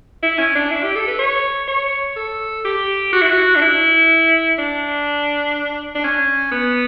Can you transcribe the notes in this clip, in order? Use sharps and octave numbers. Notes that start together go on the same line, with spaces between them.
E4
C#4
D4
E4
G4
A4
B4
C#5
C#5
A4
G4
F#4
E4
F#4
D4
E4
D4
D4
C#4
B3